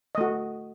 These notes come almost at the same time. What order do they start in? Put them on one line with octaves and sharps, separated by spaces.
D#5 A3 F#4